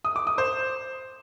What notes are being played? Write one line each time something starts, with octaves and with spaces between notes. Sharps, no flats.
D#6
D6
D#6
C5